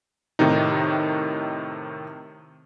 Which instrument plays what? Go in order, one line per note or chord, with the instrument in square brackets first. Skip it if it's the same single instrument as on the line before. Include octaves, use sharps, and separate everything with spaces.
[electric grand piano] A2 C3 D#3 D#4